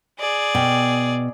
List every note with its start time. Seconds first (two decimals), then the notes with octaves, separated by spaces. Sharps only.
0.19 G#4 D5
0.55 B2 G5